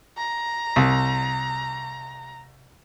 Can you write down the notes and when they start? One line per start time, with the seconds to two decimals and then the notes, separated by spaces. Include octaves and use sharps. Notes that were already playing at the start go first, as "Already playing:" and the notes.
0.18 A#5
0.76 C2